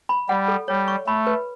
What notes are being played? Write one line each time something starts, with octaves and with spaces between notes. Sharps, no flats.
B5
G3 F#5
A4
G3 C#5
C#6
A3 B5
B4